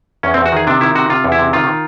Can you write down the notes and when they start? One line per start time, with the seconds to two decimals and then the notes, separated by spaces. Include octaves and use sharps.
0.23 E2 C#4
0.34 C4
0.38 E2
0.46 F#4
0.52 D#3 G#4
0.67 C3 D4
0.81 D#3 E4
0.95 C3 F#4
1.10 C3 F4
1.24 E2
1.32 E4
1.39 C3
1.53 D#3 F4
1.67 D#3